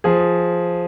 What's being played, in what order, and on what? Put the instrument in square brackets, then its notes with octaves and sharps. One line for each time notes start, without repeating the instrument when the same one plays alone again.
[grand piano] F3 G#4